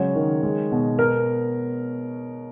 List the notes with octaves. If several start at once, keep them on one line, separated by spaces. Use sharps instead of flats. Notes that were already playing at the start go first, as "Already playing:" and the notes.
Already playing: C#3 F#3 G#3 C#5
D#3
G#3
B2
B3 A#4